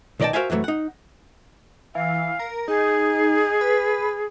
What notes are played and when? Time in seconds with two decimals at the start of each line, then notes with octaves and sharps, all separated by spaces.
0.20 B1 D#3 D5 D#5 G5 A5
0.33 F#4 A#4 C5 E5 F5 G#5
0.50 F2 E3 F#3 G#3 A3
0.64 D#4 F#5
1.95 E3 F5
2.39 A#4
2.68 D#4 G#4
3.61 B4